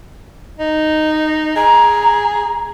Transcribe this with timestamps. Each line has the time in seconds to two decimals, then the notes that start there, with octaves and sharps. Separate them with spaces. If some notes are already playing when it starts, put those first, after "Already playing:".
0.59 D#4
1.56 G#4 A#5